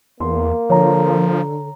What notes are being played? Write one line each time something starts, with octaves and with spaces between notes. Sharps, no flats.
E2 A#3 C6
D3 F3 C#5 A#5